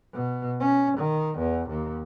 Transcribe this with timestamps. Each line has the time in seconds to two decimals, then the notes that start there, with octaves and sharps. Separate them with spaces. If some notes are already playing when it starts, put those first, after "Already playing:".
0.13 B2
0.60 C#4
0.98 D#3
1.38 E2
1.69 D#2